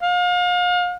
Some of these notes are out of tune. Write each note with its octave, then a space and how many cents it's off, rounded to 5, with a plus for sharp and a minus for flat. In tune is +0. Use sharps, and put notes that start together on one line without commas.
F5 +35